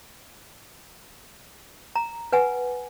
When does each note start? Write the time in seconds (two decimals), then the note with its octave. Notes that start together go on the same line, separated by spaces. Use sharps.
1.96 A#5
2.32 B4 F#5 G#5